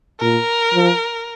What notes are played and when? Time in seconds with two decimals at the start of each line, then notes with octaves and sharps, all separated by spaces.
0.21 A#2 A#4
0.74 F3